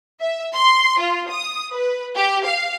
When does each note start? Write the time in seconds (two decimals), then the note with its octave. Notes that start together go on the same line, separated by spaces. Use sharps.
0.20 E5
0.54 C6
0.99 F4
1.29 D#6
1.72 B4
2.16 G4
2.46 F5